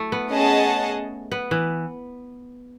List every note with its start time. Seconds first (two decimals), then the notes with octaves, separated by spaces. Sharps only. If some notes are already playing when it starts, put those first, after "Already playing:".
Already playing: A3 E4
0.12 B3
0.32 C#4 G#4 D#5 F#5 A5
1.31 B3
1.51 E3